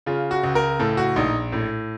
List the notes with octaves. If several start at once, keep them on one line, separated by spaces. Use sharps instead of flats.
C#3 F4
F#4
C#2
A#4
A2 A4
F#4
A#1 D#4
A2